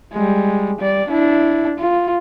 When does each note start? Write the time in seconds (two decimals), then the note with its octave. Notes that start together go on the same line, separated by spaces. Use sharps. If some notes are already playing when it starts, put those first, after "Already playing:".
0.13 G3 G#3
0.80 G3 D5
1.09 D4 E4
1.79 F4